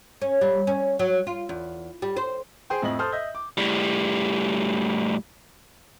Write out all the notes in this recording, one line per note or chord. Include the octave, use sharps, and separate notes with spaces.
C#4
G3
C#4
F#3
F4
E2
G3
C5
G#4 C5 G5
F2 A2 D#5 F#7
A4 C5 D#6 F6 G6
D#5 E5 G6
D6
A2 G3